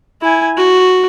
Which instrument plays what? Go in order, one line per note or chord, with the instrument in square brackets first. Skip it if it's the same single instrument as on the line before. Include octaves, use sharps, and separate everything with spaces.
[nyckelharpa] E4 G#5
F#4